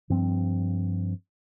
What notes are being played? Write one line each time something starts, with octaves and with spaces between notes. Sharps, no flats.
G2 F3 C4